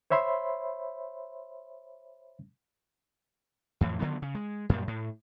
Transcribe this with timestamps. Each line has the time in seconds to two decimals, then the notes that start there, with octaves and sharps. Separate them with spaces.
0.10 C5 C#5 E5 B5 C6
3.81 F2 A2 E3
3.99 D3 D#3 F#3 B3
4.22 C#3
4.35 G#3
4.69 F#2 A#2 G3
4.88 A2